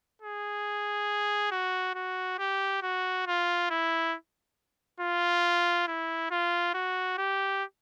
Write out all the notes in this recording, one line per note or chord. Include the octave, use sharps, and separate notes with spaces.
G#4
F#4
F#4
G4
F#4
F4
E4
F4
E4
F4
F#4
G4